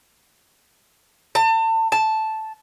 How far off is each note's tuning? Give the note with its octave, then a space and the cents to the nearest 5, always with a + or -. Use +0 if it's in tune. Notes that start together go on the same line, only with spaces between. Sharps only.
A5 +35
A5 -5